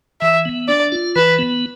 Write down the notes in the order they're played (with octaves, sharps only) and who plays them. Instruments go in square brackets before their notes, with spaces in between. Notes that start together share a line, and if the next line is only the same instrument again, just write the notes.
[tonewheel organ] E3 [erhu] E5
[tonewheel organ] B3
[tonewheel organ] D4 [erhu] D5
[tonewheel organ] F4
[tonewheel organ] E3 [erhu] B4
[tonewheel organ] B3